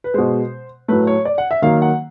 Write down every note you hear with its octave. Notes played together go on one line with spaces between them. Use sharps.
B4
B2 G#3 C5
A2 F#3 A3 B4
C#5
D5
F#5
E5
D#3 F#3 A#3 F5
F#5